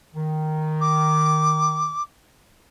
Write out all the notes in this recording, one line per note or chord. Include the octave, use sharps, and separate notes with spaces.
D#3
D6